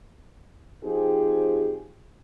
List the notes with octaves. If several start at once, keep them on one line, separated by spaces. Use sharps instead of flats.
F3 C4 D#4 G4 G#4